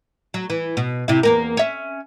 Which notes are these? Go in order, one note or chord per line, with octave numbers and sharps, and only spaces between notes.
F#3
E3
B2
C3 E4
E2 A#3 A#4
C#4 E5